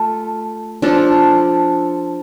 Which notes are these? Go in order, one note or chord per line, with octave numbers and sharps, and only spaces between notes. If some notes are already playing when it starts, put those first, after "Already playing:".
Already playing: A3 F4 A4
F3 D4 F4 A4